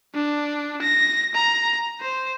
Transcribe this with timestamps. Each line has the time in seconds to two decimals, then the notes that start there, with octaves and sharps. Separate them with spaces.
0.14 D4
0.82 A#6
1.34 A#5
2.01 C5